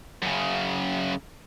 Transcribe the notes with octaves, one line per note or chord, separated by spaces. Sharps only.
F#2 C#3